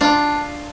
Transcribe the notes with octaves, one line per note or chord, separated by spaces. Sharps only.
D4 F4